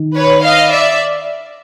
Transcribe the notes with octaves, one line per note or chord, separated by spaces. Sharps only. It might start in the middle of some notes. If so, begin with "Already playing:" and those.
Already playing: D#3
B4 C#5
D#5 F5
D5 E5